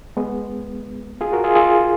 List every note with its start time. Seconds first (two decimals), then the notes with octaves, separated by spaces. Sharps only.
0.17 G#3 B3
1.21 F4 G#4
1.32 F#4 A#4
1.44 F4 G#4
1.55 F4 G#4